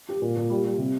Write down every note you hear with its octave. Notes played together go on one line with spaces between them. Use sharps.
G4
A#2
A#2
G3
G3
C3